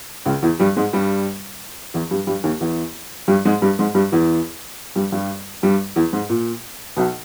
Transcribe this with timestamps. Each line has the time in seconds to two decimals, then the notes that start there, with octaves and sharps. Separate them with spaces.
0.26 C#2 C#3
0.42 E2 E3
0.59 G2 G3
0.76 G#2 G#3
0.93 G2 G3
1.94 E2 E3
2.11 G2 G3
2.27 G2 G3
2.44 D#2 D#3
2.61 E2 E3
3.28 G2 G3
3.45 G#2 G#3
3.62 G2 G3
3.79 G#2 G#3
3.95 G2 G3
4.12 E2 E3
4.96 G2 G3
5.12 G2 G3
5.63 G2 G3
5.96 E2 E3
6.13 G#2
6.29 A#2
6.97 B1 B2